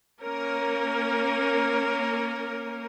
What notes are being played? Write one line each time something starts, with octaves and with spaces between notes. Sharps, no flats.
A#3 C#4 A#4